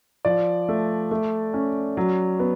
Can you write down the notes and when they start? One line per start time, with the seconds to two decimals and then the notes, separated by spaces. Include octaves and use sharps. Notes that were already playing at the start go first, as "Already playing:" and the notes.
0.25 F3 D5
0.69 A3
1.11 A3
1.54 C#4
1.97 F#3
2.39 B3